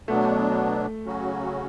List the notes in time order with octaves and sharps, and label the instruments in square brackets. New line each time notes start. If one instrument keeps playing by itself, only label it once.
[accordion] B2 F#3 B3 D4 [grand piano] A3
[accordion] C#3 F#3 C#4 F#4